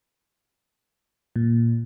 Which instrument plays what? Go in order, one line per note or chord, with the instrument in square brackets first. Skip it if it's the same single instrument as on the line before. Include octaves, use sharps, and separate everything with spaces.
[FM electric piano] A#2